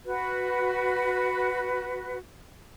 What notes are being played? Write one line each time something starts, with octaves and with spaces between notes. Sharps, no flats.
F#4 B4